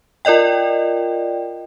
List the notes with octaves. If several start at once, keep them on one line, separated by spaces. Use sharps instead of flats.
F4 A#4 D5 D#5 G5